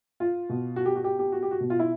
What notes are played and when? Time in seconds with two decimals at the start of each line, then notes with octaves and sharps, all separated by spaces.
0.20 F4
0.49 B2
0.76 F#4
0.86 G4
0.96 F#4
1.04 G4
1.19 G4
1.32 F#4
1.43 G4
1.51 F#4
1.60 B2
1.70 F4
1.79 E4